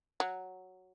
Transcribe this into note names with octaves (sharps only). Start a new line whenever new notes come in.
F#3